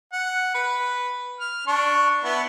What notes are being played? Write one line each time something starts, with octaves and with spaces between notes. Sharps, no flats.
F#5
B4
F6
D4 C#6
B3 E4